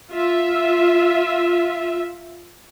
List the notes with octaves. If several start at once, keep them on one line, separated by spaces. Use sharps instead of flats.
F4 E5